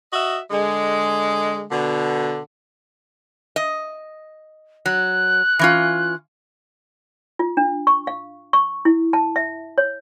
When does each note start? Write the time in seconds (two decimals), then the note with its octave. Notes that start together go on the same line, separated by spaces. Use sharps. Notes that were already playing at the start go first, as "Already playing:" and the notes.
0.12 F#4 D#5 E5
0.51 D3 G#3
1.72 B2 D3
3.56 D#5
4.86 F#3 F#6
5.59 E3 C#4 F4
7.39 F4
7.57 D4
7.87 C#6
8.07 F5
8.53 C#6
8.85 E4
9.13 A5
9.36 E5
9.78 C#5